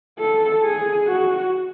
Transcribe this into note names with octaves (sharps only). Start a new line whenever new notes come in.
A4
G#4
F#4